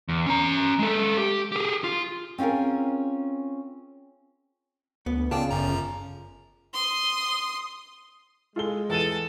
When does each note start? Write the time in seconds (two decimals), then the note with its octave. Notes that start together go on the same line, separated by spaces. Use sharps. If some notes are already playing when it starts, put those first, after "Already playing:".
0.09 E2
0.26 C#4 A#5
0.79 G#3 A4
1.17 G4
1.52 G4 G#4
1.84 F4
2.38 C4 C#4 F4 G#4 A#4
5.06 D2 B3
5.31 C#3 F4 G#4 D5 G5 A5
5.51 G1 F#2 A#5
6.74 C6 D#6
8.56 G#3 F4 A4 G7
8.90 E2 A4 A5 D#7